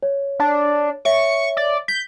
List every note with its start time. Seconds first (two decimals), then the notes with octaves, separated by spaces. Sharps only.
0.03 C#5
0.39 D4
1.05 C#5 E5 C#6
1.57 D5
1.88 G6 B6